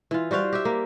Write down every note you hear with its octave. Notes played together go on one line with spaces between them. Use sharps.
E3 F4
G3 F#4 C5 F5
G4 E5
A#3